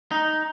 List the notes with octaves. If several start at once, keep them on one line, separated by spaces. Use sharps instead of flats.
D#4